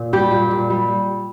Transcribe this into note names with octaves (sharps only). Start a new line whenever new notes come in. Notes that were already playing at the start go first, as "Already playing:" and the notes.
Already playing: A#2
G3 G4
A#2
A#2
G3